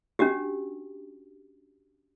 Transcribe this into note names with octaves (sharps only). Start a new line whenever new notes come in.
C#4 D4 F#4 G4